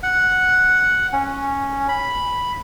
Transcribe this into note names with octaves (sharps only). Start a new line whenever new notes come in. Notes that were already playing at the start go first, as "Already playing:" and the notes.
F#5
C#4
B5